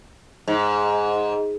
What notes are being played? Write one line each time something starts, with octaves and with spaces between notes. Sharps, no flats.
G#2